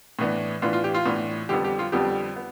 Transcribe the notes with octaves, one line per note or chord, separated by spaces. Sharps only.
A2 E3 B3 D4
A2 E3 B3 D4 F4
F4
G4
F4
A2 E3 B3 D4
F2 D3 G3 B3 G4
G4
F4
F2 D3 G3 B3 G4
B3